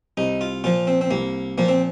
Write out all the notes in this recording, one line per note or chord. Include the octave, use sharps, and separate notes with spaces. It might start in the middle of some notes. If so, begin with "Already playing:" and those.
C2 D#4
F4
A#2 F3 F4
C4
C4
C2 A#3
A#2 F3 A#3
C4